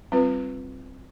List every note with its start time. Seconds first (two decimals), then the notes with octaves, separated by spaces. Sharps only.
0.12 G3 C4 F4 B4